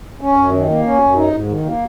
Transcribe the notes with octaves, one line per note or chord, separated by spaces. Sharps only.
C#4
F#2
D#3
A#3
C#4
F#2
D#4
G#2
D#3
A#3